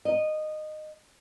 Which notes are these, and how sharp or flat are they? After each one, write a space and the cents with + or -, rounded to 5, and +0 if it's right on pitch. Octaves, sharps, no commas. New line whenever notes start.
D#5 -15